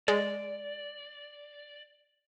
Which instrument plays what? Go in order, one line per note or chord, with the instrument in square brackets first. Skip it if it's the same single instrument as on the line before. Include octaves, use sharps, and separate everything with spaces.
[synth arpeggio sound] G#3 [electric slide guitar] D5